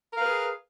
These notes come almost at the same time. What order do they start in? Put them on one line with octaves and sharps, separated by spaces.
A#4 F5 B4 G#4